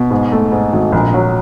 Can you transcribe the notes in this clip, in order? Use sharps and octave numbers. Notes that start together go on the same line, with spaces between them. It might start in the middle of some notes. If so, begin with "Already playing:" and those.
Already playing: B2
G#2
A3
G#2
G#1
A#1
F#3